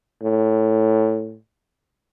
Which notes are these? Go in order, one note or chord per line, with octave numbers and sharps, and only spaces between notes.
A2